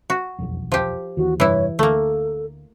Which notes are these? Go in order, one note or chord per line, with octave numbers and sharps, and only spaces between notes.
F#4
E1 B1 F2
F3 G4
D#2 E3 F#4
F1 G2 E3 E4 C#5
D2 A3 A#3 A4